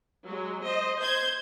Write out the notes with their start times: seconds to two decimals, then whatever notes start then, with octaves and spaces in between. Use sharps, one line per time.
0.24 F#3 G#3
0.64 C5 D#5
0.99 C5 G6 G#6